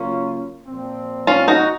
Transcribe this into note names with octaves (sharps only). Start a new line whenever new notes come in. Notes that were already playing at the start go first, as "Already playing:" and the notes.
Already playing: C#3 F#3 A#3 C#4 F4
A#2 F3 C4
C#4 F4
D#4 F#4